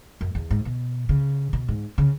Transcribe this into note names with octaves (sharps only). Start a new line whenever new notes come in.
F#2
E2
G#2
B2
C#3
B2
G#2
C#3